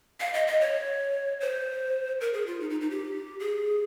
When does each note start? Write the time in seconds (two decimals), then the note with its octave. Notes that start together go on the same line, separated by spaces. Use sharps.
0.20 F5
0.34 D#5
0.47 D#5
0.61 C#5
1.41 C5
2.21 A#4
2.33 G#4
2.47 F4
2.60 D#4
2.70 D#4
2.81 D#4
2.90 G4
3.40 G#4